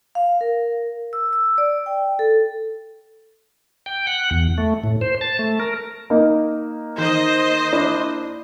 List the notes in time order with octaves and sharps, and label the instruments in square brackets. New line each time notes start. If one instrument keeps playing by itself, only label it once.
[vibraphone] F5
A#4
E6
E6
D5
G5
A4
[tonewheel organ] G5
F#5
E2
A3
A2
C5
A5
A3
A#4
[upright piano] A#3 D#4
[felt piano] D#3 [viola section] C5 D#5
[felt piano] D4 E4